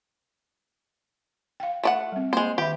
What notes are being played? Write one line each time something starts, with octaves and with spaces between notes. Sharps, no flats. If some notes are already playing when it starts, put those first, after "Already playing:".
F5 G5
A3 D5 F#5
G3 C4
G#3 A#3 C5
D#3 G4 E5 B5